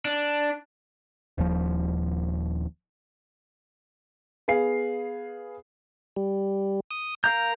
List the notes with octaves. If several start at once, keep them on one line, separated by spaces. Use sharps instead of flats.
D4
D#1 D#2 F3
B3 G#4 F5 C7
G3
D#6
A#4 F5 A#5 G6